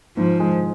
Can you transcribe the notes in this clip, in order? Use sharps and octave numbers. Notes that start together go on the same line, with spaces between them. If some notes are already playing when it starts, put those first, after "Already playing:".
G#2 F3
G#3